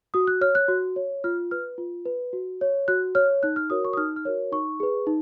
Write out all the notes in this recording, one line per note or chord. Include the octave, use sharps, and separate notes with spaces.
F#4 D#6
F#6
C#5 F6
F#6
F#4
C#5
F4 F6
B4 F6
F4
B4
F#4
C#5
F#4 F#6
C#5 F6
D#4 F#6
F6
F#4 A#4 C#5 D#6
C#6
D#6
D#4 F6
F6
F#4 A#4 C#5
D#4 C#6
G#4 B4
D#4